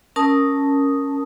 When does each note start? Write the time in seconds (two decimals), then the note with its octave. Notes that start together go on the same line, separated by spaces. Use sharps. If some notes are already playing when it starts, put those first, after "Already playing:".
0.16 C#4 A#4 A5 D#6